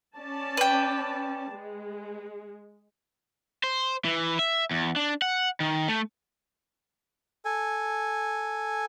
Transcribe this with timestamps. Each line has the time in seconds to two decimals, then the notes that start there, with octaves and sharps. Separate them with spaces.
0.17 C#4 D5 A5
0.57 B4 G5
1.53 G#3
3.63 C5
4.04 E3
4.39 E5
4.71 E2
4.96 D4
5.22 F#5
5.60 D#3
5.88 A3
7.45 A4 G#5